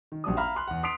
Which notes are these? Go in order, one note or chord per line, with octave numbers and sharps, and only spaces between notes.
D#3
A#1 G3 D4 F#4 D5 D#6
E5 F5 A#5 B5 F6
B5 C6 F#6
E2 F#5
C6 D#6 B6 C7 D7 F7